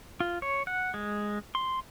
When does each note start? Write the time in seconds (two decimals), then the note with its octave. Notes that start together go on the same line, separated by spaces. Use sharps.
0.20 F4
0.42 C#5
0.67 F#5
0.94 G#3
1.55 C6